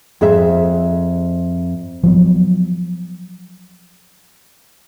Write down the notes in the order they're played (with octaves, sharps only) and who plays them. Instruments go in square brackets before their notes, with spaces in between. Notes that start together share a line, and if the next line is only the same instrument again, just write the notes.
[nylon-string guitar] F2 G#4 C5 E5
[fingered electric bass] F3 F#3 B3